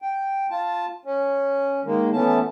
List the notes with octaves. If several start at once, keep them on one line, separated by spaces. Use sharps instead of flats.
G5
F4 A5
C#4
D#3 G#3 A#3
E3 A3 B3 C#4 A5